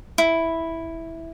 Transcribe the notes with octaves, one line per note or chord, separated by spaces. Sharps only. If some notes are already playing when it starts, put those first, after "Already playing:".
E4